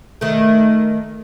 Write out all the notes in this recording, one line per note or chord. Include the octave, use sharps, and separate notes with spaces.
D#3 A3